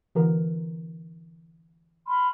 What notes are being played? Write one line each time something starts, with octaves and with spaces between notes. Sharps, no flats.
D3 E3 A#4
B5 C6 F6